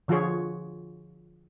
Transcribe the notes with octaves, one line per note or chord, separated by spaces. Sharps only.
D3 F3 F4 F#4 G#4 C#5